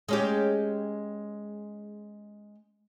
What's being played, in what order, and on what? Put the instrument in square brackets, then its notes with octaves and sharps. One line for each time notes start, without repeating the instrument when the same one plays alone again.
[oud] G#3 C#4 G4